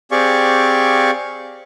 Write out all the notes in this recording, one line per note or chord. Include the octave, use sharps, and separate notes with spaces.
C4 G4 G#4 D5 F5 C#6